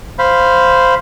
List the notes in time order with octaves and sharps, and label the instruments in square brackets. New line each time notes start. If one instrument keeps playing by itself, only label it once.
[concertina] C5 F5 B5